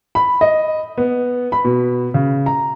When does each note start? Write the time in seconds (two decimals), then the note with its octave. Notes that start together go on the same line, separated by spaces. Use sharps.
0.15 B5
0.41 D#5
0.98 B3
1.52 B5
1.65 B2
2.14 C#3
2.46 A#5